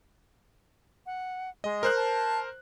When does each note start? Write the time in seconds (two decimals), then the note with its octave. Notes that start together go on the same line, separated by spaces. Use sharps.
1.06 F#5
1.64 G#3 D#5
1.83 A#4 C5 F#6
1.96 A5